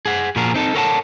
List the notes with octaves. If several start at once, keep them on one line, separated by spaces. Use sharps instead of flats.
G#4 F#5
A#2 F3 F#4 G#4 A#4
C4 D#4 A4
A4 A#4 C#5 F#5 G5 A5